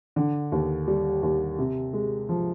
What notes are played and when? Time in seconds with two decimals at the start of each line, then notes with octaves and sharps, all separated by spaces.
0.16 D3
0.52 D#2
0.87 G3
1.23 D#2
1.59 C3
1.93 G#3
2.29 F3